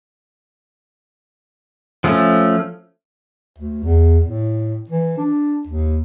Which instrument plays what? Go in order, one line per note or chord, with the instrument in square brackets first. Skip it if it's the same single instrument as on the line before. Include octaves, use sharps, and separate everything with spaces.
[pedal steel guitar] F3 A3 C#4
[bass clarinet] D2
E2
A2
E3
D4
D#2